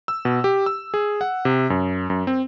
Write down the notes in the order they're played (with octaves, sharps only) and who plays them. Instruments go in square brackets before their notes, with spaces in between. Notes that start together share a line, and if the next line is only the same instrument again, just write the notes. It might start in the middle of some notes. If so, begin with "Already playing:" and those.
[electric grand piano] E6
B2
G4
E6
G#4
F#5
C3
F#2
F#2
C4